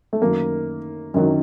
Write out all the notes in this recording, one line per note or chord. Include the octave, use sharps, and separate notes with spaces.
A3
F#2 D#3 F#3 A#3
F#2 D#3 F#3